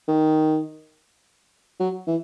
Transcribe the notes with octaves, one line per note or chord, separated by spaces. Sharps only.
D#3
F#3
E3